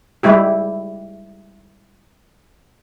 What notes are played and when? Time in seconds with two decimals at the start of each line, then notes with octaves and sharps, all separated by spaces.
0.23 G3 G#3 E4 G4